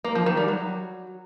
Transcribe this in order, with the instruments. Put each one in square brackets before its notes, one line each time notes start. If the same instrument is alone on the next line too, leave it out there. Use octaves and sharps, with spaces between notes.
[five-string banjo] A#3
F3
D#3
G3
F#3